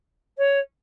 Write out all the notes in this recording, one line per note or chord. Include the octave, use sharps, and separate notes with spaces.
C#5